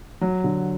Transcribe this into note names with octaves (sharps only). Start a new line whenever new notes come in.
F#3
D3